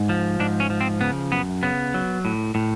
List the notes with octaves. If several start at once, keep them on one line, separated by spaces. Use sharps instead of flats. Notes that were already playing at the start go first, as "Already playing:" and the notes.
Already playing: G#2
F3
G#2 D4
C#4
F3
C4
C#3 B3
F#2 B3
C#3 B3
F#3
A2
A2